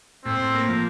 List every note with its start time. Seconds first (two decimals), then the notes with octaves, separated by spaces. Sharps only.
0.25 A2 C4
0.39 A2
0.54 A#3
0.69 F3